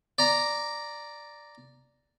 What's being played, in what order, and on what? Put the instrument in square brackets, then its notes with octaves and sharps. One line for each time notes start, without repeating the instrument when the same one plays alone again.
[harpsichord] D5 A#5